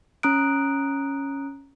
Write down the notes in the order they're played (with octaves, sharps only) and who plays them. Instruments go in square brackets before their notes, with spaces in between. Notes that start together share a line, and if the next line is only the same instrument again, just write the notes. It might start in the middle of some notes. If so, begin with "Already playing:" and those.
[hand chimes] C#4 A#5 D#6 F#6 D7